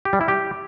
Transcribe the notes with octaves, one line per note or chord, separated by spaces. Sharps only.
G4
G3
E4
G4